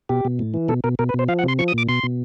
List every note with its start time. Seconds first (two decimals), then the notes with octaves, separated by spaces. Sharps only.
0.09 B2 G4
0.25 B2
0.39 A2
0.54 E3
0.68 B2 A4
0.84 B2 A#4
0.99 B2 A#4
1.09 B4
1.14 B2 C5
1.28 F3 F5
1.39 F#5
1.43 C3 C6
1.59 F3 C#6
1.68 D#6
1.74 A#2 D6
1.89 B2 C6
2.04 B2